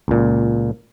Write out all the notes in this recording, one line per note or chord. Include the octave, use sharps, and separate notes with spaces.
C#2 A#2